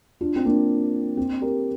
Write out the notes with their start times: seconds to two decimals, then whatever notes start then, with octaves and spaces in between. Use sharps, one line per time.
0.21 D4 F4
0.36 C4
0.45 A#3 D4
1.17 C4
1.41 G4 A#4